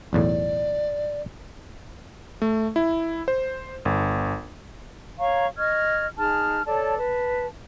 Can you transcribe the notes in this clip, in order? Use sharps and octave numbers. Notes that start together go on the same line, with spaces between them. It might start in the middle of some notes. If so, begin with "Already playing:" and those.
B1 E2 A2 D5
A3
E4
C5
G1
C#5 F5 A#5 C#6
D#5 C#6 F6 G#6
D#4 G#4 A5 F6
A4 C#5 D5 A5
B4 A5